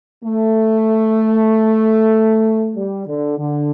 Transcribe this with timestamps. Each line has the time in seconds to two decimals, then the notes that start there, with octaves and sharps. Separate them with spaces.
0.24 A3
2.75 G3
3.07 D3
3.38 D3